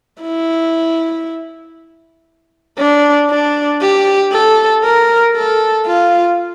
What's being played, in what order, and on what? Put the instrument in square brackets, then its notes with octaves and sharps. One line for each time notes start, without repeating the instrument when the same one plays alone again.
[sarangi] E4
D4
D4
G4
A4
A#4
A4
F4